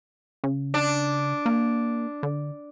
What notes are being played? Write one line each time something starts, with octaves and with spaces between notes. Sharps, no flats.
C#3
D4
A#3
D3